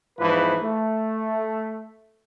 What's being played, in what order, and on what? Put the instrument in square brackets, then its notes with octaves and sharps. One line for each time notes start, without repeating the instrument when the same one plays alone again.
[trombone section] E2 G#2 E3 F3 B4
A3